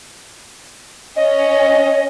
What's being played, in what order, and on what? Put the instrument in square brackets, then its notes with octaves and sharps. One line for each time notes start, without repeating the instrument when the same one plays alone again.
[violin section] C#4 [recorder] D#5